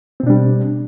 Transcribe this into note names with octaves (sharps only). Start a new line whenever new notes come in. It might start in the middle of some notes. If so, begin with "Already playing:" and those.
B2 G3 C4 D4